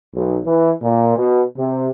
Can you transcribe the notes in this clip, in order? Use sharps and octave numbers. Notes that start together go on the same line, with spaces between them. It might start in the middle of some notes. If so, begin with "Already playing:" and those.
B1
E3
A#2
B2
C3